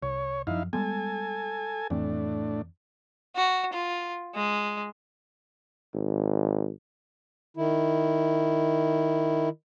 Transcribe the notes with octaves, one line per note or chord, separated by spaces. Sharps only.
C2 C#5
F#2 F3 D#4 E4 F5
G3 G#3 B3 A4 G#5
F2 A2 E3 C4 D4
F#4
F4
G#3
G#1
D#3 E4